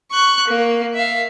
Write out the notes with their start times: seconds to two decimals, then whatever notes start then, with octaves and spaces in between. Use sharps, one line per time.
0.12 C#6 F#6
0.47 A#3
0.94 E5 F5